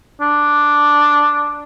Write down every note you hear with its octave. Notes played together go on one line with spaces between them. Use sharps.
D4